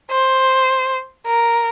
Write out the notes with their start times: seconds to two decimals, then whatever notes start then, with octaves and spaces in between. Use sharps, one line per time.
0.10 C5
1.26 A#4